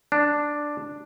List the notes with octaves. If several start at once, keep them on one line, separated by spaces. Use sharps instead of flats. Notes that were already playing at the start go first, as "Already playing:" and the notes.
D4